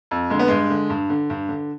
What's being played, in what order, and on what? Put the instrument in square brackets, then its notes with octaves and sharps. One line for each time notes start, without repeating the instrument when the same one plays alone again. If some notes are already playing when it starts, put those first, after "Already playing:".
[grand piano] F2
D3 G#3
B3
G2 G#3
D3
G2
D3
G2
D3